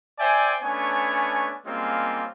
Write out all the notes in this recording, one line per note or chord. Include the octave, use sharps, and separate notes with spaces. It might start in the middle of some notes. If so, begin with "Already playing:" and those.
C5 D5 E5 G5 G#5
A3 B3 C#4 D4 C#5 G#5
G3 G#3 A#3 C4 C#4 F4